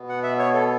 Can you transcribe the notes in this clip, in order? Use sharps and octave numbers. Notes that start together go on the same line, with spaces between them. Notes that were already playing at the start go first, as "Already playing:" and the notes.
Already playing: B2 B3
F#5
E5
C#5
A4